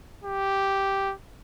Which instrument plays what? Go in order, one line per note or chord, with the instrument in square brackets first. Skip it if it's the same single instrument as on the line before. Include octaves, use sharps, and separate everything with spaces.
[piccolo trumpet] G4